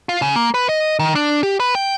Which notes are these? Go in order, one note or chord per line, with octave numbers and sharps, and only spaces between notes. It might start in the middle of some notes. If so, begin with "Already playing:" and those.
F4
C#3
A#3
B4
D#5
D#3
D4
G4
B4
G5